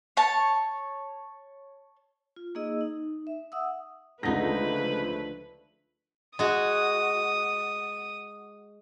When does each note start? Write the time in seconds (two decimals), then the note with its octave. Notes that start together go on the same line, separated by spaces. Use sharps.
0.17 C#5 A5
2.36 F4
2.55 A#3 D#4 G#4 D#5 E6
2.81 D#4
3.27 E5
3.52 E5 F#5 D#6 E6
4.23 C#2 D3 F3 A3 D#4 B4 A#6
6.39 G#3 F#4 D#6